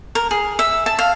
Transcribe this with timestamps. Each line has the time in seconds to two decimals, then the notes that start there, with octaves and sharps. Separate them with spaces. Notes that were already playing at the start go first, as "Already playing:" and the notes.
0.15 A#4
0.31 G#4
0.59 E5
0.86 A5
0.99 F5